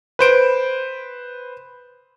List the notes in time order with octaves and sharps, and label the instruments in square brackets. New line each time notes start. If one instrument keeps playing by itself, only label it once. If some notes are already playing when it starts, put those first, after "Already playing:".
[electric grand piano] B4 C5 D7